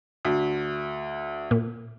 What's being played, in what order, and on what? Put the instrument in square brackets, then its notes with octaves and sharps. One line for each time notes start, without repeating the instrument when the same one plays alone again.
[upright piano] D2
[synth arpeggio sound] A#2